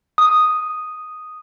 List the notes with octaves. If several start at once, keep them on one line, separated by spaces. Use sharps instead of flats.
D#6